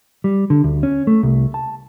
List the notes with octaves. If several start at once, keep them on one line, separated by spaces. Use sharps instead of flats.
G3
D3
D2
C#4
A3
C2
A5